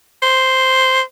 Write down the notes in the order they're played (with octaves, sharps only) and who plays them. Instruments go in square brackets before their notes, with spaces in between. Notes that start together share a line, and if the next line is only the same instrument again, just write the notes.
[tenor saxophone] C5